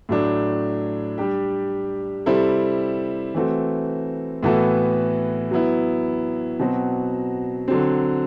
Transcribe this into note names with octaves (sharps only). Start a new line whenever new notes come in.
A2 F#3 A3 D4
G3 D4 G4
C3 G3 C4 E4 A4
E3 A3 C4 F#4
A2 E3 B3 F#4 A4
F#3 B3 E4
B2 F#3 C4 F#4
D3 F#3 C4